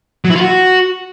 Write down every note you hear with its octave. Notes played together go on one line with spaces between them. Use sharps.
F#3
E4
F4
F#4